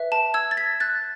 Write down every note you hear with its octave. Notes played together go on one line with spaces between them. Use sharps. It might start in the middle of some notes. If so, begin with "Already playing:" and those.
Already playing: B4 E5
A5
E6 G#6
A6
G#6 B6
F#6 A6